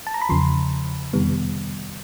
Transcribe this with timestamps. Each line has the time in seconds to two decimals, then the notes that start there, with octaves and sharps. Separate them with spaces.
0.07 A5
0.14 A#5
0.22 B5
0.29 E2 C#3 F3 C6
1.13 F2 C3 D#3 G3 B3